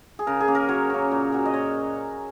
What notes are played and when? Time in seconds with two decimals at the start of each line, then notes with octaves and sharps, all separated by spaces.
0.19 G#4
0.27 C#3 A#4
0.41 G#4
0.48 A#3 C#4
0.55 A#4
0.69 F#3 C#5
0.90 A#3 C#4
1.12 A#2
1.32 F#3 A#3
1.45 D#5
1.54 A#2 C#5